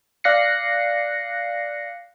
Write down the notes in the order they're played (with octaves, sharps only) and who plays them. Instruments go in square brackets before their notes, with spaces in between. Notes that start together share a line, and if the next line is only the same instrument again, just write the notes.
[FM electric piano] D5 F5 F#6 A#6 C7 C#7